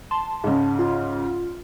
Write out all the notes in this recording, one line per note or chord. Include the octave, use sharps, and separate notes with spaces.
A5 C6
G#2 C#3
F4